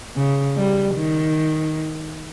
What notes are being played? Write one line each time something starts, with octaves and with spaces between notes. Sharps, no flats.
C#3
G3
D#3